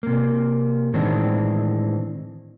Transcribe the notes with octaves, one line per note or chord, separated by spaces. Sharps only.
C3 A#3
A2 D#3 E3 G#3 C4 D4